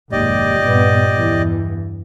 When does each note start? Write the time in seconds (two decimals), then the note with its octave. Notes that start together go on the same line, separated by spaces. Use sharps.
0.12 F1 D#2 G#2 G4 D5 D#5
0.62 G2 A#2 B3
1.18 E2 G2 E3